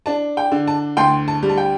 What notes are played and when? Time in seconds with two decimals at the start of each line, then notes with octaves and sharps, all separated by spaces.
0.06 D4 A5
0.37 G5
0.52 D3
0.67 A5
0.97 D2 G5 C6
1.28 A5
1.43 G3
1.49 A5
1.58 G5